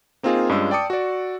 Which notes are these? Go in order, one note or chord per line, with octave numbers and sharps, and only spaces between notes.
A#3 C4 D#4 F4 G#4 A#4
G2 G#3 C#4 F4 E6
D5 G5 A5 D6 D#6 C#7
F#4 D5